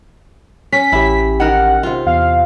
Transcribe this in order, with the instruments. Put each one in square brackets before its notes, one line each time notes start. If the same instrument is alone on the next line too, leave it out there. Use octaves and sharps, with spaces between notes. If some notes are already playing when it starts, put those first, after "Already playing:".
[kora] C#4 [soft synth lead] B6
[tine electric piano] A1 G4 [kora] E4
[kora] D#3 A#4 [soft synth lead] F#5
[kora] C3 F4
[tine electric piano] E2 [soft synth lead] F5